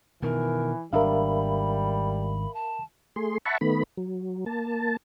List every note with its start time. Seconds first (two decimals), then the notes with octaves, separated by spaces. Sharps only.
0.22 B2 D#3 E3 A#4
0.93 G#1 G3 D4 A#4 E5 F5 B5
2.54 A5
3.16 A3 G#4 C6
3.45 E5 F#5 A5 B5 C#6
3.61 D#3 A3 B3 B5
3.97 F#3
4.46 A#3 A5